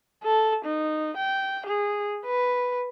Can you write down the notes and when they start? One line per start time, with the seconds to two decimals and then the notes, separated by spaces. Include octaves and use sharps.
0.24 A4
0.65 D#4
1.17 G5
1.66 G#4
2.26 B4